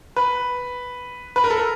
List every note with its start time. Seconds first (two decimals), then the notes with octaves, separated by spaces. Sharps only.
0.16 B4
1.36 B4
1.44 A#4
1.50 A4
1.57 A#4